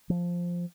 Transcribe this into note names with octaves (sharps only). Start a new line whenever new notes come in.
F3